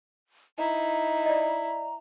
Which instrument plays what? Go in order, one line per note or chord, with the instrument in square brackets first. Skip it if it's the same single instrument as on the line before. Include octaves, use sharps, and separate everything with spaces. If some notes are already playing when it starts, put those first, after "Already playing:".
[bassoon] D#4 [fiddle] E4 [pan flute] A#5
[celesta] D5 D#5